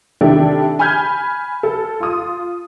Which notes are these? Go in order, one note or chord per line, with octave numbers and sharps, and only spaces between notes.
C3 D#3 D4 E4 G4 A4
G#5 B5 F6 G6 G#6
A4
F4 D#6